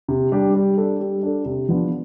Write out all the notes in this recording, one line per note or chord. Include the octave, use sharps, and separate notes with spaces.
C3
G3 D4 G4
G3
D4 A4
G3
D4 A4
C3
F3 B3 D4